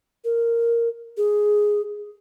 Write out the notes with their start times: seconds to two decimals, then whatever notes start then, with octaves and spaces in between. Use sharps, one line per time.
0.24 A#4
1.17 G#4